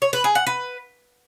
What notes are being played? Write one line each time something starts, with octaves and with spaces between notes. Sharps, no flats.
C#5
B4
G#4
F#5
B4